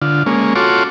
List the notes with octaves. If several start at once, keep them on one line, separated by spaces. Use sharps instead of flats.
D3 F4
G#3 A#3 C#4
F4 F#4 A4 C#5 C6 D6